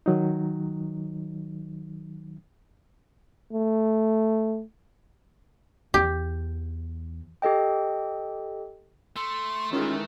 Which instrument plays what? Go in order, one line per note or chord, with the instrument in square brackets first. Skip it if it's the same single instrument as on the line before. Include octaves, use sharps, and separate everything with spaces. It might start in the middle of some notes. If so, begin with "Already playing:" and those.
[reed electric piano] D#3 F#3 D#4
[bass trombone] A3
[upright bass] E2 [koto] G4
[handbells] G4 A4 D#5 G5
[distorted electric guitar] A3 [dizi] C6
[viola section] D#3 E3 G#3 [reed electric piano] C#4 [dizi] F4